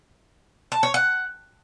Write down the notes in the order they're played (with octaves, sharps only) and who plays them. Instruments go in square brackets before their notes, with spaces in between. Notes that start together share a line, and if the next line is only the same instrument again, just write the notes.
[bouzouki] A5
C#5
F#5